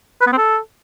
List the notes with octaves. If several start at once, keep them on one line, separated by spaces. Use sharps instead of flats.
B4
B3
C4
A4